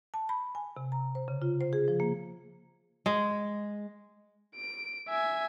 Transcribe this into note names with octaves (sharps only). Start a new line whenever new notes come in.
A5
B5
G#5
C3
A#5
C5
C#3
F4
C5
G#4
F3
A#3
G#3
D7
E5 G#5